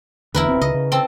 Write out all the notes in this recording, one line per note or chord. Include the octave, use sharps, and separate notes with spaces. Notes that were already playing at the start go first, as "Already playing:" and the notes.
D1 E2 D3 E4 A#4 B4
D#1 B2 C4
C#2 C#3 D#5
C#3
C4 A4